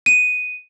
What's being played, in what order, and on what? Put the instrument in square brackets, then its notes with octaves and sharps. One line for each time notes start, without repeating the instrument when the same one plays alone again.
[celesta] D#7